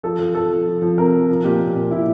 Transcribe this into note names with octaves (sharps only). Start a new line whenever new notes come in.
F3 A4
F3
F3 A4
F3
F3
F3
C3 A#4
F3
F3
A#2 G4
A#2
A#2
A#2 E4